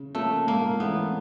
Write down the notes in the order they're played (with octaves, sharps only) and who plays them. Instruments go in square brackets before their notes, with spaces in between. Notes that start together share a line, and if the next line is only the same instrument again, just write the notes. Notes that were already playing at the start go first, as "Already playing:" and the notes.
Already playing: [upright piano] C#3
[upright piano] F3 A#3 C#4 [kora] A3
[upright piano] G#2 [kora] A#3
[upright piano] E3 A3 C#4 [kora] B3